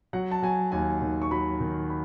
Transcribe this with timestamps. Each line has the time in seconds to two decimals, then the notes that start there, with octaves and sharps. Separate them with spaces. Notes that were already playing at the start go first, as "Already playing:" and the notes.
0.13 F#3 F#5
0.31 A5
0.42 F#3 G#5
0.72 D#2 G#5
1.02 D#3
1.22 C#6
1.31 F#3 B5
1.60 D#3
1.90 B5